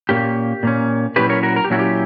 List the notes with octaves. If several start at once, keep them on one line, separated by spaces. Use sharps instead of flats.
A#2 A#3 C#4 G4
A#2 A#3 C#4
A#2 F#3 C#4 E4 G4 B4
A#4 C#5
F#4 A#4
A#4
G4
A#2 F#3 C#4 E4 F#4
G4